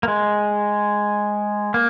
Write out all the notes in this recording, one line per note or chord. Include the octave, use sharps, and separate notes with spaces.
A#3
G#3
A#3